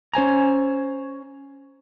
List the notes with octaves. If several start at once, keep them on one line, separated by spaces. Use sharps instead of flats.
C#4 C5 G#5 A#5